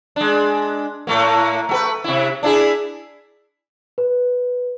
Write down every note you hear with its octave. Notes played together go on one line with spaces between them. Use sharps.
G#3 D4
A2 A3 A#3
A3 F#4 B4
C3 E4
D4 E4 G#4
B4